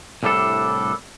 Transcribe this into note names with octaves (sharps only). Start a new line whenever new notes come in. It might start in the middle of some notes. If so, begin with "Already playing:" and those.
C2 A2 G3 D4 A4